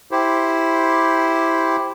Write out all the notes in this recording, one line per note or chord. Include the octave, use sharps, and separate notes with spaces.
E4 G4 C5